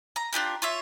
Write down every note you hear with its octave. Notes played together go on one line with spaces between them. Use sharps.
A#5
D4 F4 G4 A#4
F4 C#5 E5